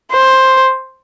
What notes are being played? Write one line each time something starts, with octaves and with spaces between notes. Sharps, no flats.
C5